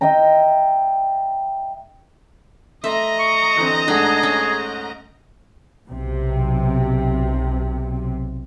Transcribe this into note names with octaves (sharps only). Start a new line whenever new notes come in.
D#5 E5 G5 A#5
A3 D#5 E5 A#5 C6
C#6
D3 E3 C4
G#2 A3 D4 G#4 F#5
C#4
B1 C3